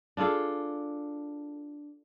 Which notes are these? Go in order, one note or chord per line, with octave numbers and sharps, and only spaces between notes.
D4 F4 G#4 A4